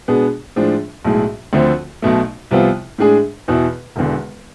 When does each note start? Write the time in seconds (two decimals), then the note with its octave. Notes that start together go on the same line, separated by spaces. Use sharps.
0.08 B2 G#3 B3 D4 G#4
0.56 A2 F3 G#3 D4
1.04 B1 A2 G#3
1.53 D2 D3 F3 A3 C4
2.02 B1 B2 A3
2.51 C2 C3 F3 B3 F4
2.98 A2 G#3 D4 G#4
3.48 E2 B2 B3 E4
3.96 E1 E2 D3